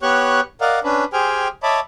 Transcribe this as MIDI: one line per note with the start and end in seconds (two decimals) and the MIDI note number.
0.02 0.40 59
0.02 0.40 67
0.02 0.40 73
0.02 0.40 85
0.02 0.40 90
0.61 0.80 70
0.61 0.80 74
0.61 0.80 75
0.61 0.80 77
0.61 0.80 78
0.84 1.05 61
0.84 1.05 62
0.84 1.05 71
1.13 1.48 67
1.13 1.48 68
1.13 1.48 72
1.13 1.48 79
1.13 1.48 80
1.13 1.48 89
1.63 1.80 73
1.63 1.80 75
1.63 1.80 76
1.63 1.80 81
1.63 1.80 83
1.63 1.80 86